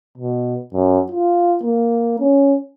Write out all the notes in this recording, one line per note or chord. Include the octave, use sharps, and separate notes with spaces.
B2
F#2
F4
A#3
C#4